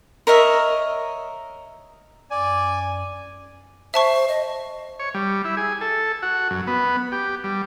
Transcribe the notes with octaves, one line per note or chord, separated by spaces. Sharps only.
A#4 C#5 D#5 E5
F#2 D5 G#5
C5 E5 A5 C#6
D#5
C#5
G3
E4
G#4
A4
F#4
F#2
B3
G4
G3